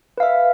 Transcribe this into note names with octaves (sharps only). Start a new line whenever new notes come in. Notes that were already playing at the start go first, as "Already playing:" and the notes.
B4 E5 F5